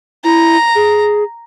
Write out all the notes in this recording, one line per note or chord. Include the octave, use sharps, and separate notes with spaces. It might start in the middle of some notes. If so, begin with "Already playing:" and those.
E4 A#5
G#4